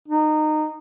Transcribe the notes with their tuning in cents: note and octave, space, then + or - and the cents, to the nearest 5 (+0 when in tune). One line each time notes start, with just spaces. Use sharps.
D#4 -20